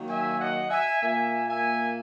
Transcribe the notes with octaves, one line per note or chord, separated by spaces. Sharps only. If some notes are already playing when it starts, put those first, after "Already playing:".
Already playing: D#3 F#3 A#3
E5 G#5
D#5 F#5
E5 G#5
A#2 A#3 E5 G#5
E5 G#5